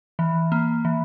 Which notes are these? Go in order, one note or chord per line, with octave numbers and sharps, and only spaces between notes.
E3
A#3
E3